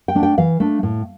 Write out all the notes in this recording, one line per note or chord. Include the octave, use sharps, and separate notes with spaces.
G5
A3 D4
G5
E3 F5
A3 D4
A2